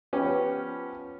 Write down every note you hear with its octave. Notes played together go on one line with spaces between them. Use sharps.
F3 B3 C#4 G4